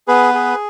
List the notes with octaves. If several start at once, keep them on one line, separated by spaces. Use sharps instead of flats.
B3 G#4 B4
G#4